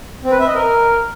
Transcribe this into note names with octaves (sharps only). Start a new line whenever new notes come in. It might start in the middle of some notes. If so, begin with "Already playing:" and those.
C4
B4
E5
D#5
A#4